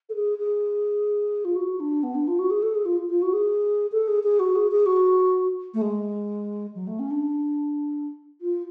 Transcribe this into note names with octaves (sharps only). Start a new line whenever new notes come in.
A4
G#4
G#4
F4
F#4
D4
B3
D4
F4
F#4
G#4
A4
G#4
F4
F4
F#4
G#4
A4
G#4
G#4
F#4
G#4
G#4
F#4
A3
G#3
F#3
A3
C#4
D4
F4